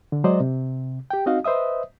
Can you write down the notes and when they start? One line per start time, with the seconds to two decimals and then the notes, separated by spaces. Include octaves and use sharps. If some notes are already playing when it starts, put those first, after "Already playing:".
0.12 D3
0.24 F#3 G#3 C5 D5 D#5
0.40 C3
1.10 G4 G5
1.26 C4 D#4 F#4 D#5 F5
1.44 B4 C5 D#5 E5 D#6